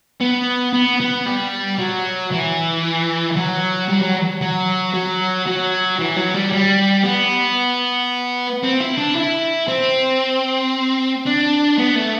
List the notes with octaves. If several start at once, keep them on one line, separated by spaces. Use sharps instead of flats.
B3
B3
B3
G3
F#3
E3
F#3
G3
F#3
F#3
F#3
F#3
E3
F#3
G3
G3
B3
C4
E4
D4
E4
C4
D4
B3
A3